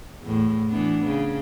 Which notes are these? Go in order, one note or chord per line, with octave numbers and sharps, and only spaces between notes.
E2 A2
E3 B3 D4
C#3